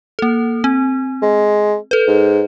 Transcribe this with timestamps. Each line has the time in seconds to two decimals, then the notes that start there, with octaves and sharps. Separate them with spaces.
0.19 A#3 A4
0.64 C4
1.22 G#3
1.91 A4 B4
2.07 G#2